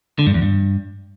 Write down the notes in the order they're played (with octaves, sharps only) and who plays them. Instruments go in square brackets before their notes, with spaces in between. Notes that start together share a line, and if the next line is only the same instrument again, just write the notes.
[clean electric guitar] D3
G2
E2
G2